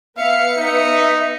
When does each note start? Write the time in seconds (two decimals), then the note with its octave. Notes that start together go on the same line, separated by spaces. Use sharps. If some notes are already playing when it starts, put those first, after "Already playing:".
0.17 B3 E5 F5 C#7
0.58 D#4 E5